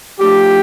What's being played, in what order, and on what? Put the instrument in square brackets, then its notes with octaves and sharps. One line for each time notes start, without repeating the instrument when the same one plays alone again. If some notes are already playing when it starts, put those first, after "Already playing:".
[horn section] F3 A3 D4 G4